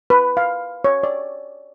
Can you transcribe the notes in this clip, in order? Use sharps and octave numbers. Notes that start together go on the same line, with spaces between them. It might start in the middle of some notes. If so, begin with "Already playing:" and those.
B4
F5
C#5
D5